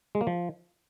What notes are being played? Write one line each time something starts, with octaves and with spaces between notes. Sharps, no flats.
G#3
A#3
F3